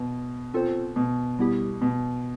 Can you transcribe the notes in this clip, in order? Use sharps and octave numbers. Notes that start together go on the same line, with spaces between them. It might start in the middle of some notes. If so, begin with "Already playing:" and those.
Already playing: B2
C4 F4 A4 C5
B2
G3 B3 E4 G4
B2